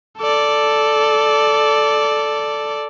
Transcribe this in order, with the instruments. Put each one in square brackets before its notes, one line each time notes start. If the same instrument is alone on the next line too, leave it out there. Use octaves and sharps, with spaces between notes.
[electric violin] A4 D5